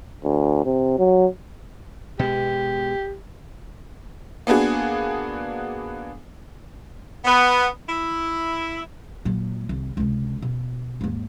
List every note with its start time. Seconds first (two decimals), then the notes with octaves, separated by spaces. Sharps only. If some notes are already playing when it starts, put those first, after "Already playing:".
0.24 D2
0.65 C3
0.99 F#3
2.19 B2 G#3 G4
4.47 A#3 B3 D4 F#4 G#4
7.25 B3
7.87 E4
9.25 A#2 F#3
9.69 C2 D#3
9.97 C#2 C3
10.42 B2
11.01 D#2 G#2